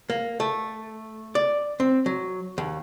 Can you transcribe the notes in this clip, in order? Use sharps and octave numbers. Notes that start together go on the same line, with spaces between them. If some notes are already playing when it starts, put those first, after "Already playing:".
A#3
A3
D5
C4
F#3
D#2